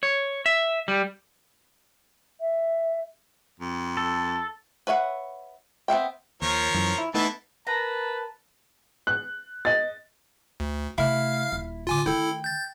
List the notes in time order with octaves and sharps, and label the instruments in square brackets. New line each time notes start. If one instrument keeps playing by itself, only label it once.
[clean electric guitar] C#5
E5
G3
[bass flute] E5
[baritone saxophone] F2
[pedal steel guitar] A4
[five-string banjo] B4 C#5 E5 F#5
B3 C4 E5 G5
[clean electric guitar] D#2 [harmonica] F3 A#4 C#5
[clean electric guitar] F#2 E3
E4
[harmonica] E3 E4 A5 [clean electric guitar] A3 B3 D#4
[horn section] A#4 B4 A5 [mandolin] A#5
[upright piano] F#6
D#5 A6
[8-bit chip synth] D2
[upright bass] C3 A3 [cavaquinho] E4 [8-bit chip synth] F5 F6
[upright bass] D#1
[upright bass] A2 D3 [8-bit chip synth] F4 G#5 D6
[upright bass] D#3 A3 [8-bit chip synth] E4 A4 [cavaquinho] G5
[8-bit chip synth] G6 A6